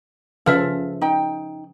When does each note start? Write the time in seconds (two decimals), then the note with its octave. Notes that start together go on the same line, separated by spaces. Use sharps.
0.46 C#3 F3 A4 B4 E5 F5 F6
1.01 D#4 G5